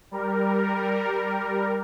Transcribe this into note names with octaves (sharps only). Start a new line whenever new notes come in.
G3 A#4